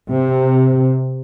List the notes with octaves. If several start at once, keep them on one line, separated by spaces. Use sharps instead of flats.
C3